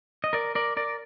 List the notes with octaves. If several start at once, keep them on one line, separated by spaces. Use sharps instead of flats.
D#5
A#4 D5
A#4 D5
A#4 D5